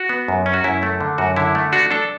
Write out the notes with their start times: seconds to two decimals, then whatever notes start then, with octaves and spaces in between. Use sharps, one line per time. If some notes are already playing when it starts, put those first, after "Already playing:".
Already playing: F#4
0.09 B3
0.28 F#2
0.46 C#4
0.54 F#4
0.64 F#2 E4
0.82 A3 E4
1.01 D3
1.18 F#2 F#4
1.36 D3 E4
1.55 A3
1.72 D4 F#4
1.91 D4 A4